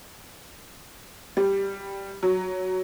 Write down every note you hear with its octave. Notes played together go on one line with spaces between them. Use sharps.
G3
F#3